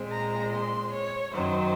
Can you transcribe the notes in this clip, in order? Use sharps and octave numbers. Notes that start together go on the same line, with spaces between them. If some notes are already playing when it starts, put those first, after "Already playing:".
Already playing: A#2 G#3 C4
A#5
C6
C#5
F#2 D#3 F#3 C5